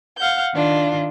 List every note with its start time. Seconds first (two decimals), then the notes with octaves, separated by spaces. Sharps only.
0.18 F5 F#5 G6
0.53 D#3 D4 F4